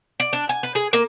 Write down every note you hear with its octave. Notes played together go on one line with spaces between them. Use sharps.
D5
D4
G#5
B4
G#4
A#3